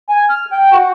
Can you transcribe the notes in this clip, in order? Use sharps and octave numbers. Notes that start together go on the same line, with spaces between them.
G#5
F6
G5
F#4